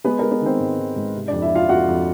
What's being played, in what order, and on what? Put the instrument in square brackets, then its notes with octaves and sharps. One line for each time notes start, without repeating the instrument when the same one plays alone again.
[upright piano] G#3 B3 B4
G#3 A#4
B3 B4
D#3 C4 C5
G#2
D#3
G#2
C3
F2 D4 D5
E4 E5
F2 F4 F5
F2 F#4 F#5
F2